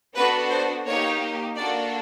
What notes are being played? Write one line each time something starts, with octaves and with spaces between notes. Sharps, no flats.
B3 D4 F#4 A4 B4
C5
A#3 D#4 G4 C#5
A#3 D4 F#4 A4 D5